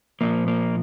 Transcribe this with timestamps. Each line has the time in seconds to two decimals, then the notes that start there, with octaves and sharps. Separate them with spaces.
0.21 A#2 F3 A#3
0.48 A#3